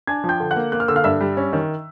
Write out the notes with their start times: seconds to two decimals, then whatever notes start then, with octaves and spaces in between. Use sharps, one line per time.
0.07 D4 G#5 G#6
0.24 F3
0.29 G5 G6
0.40 D3
0.51 F#5 F#6
0.56 A#3
0.72 A#3 F#6
0.80 F6
0.88 D3 E6
0.96 F5 F6
1.04 G2 E5 E6
1.21 G3
1.37 C#4
1.53 D#3